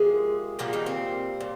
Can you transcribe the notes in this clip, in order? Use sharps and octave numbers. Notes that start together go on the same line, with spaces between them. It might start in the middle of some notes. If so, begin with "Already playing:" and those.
Already playing: C3 F3 G#3 A#3 G#4
A#2 F3 G3 A#3 F4
D#3 D#4
C4
A#2